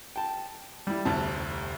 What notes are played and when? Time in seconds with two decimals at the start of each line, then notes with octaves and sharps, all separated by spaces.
0.16 G5 A5
0.87 G3 E4
1.05 F1 D2 C3 A5